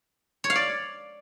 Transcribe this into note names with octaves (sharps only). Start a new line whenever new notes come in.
C#5
F5
D5